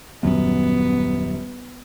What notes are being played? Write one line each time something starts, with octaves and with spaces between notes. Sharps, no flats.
D#1 F#2 B3